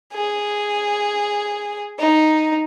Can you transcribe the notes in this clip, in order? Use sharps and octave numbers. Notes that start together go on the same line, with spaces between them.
G#4
D#4